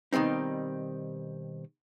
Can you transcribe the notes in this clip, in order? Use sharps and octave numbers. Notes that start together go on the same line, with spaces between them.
B2 D#3 G3 C4 D#4